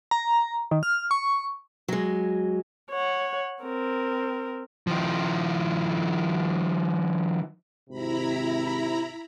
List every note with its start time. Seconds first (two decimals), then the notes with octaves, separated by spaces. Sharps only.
0.11 A#5
0.71 D#3
0.83 F6
1.11 C#6
1.88 F#3 G#3
2.91 C#5 F#5
3.63 C4 A#4
4.87 D#3 F3
7.90 G#1 C3 E4 A#5 B5